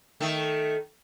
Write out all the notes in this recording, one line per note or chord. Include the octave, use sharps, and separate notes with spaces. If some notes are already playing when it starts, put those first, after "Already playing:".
D#3 A3